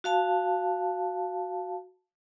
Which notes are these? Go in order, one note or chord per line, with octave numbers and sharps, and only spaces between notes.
F#4 F5 A5